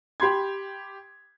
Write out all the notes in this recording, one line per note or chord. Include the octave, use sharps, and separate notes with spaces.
G4 B5 C6 G#6